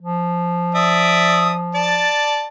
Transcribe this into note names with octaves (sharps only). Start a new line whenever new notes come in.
F3
D5 E5 D#6
D5 A5